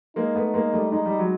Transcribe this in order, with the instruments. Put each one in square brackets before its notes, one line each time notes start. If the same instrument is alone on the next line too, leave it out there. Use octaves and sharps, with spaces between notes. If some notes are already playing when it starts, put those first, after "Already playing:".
[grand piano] G#3 A#3 [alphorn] D#4
[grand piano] A3 B3
G#3 A#3
G3 A3
[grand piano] G#3 [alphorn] D#4
[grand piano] G3
F#3 G#3